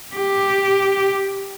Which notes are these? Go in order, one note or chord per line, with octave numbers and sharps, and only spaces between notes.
G4